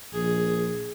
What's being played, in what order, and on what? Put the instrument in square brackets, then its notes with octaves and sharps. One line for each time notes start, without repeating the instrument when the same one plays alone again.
[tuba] A#1 [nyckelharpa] G#4